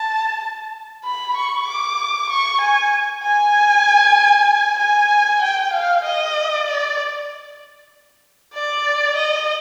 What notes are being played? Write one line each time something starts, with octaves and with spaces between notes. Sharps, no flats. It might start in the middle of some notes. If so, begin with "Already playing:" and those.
Already playing: A5
B5
C#6
D6
C#6
G#5
G#5
G#5
G5
F5
D#5
D5
D5
D#5